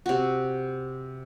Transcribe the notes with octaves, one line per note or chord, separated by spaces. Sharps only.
C3 F#4